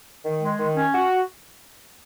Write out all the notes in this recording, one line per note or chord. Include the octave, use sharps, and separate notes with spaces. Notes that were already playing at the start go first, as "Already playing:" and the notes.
D#3
G#3
D#3
C#4
F#4